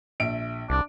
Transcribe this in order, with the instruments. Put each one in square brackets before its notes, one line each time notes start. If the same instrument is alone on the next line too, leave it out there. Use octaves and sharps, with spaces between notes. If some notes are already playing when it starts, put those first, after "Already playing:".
[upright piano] A#1 E5 D7
[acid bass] C2 [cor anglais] D4